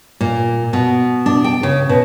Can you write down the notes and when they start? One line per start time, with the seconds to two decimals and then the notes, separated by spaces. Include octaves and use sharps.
0.21 A#2
0.73 B2
1.26 D4
1.44 G5
1.63 C#3
1.89 B2